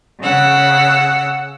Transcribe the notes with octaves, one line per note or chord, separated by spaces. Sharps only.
C#3 F#5 E6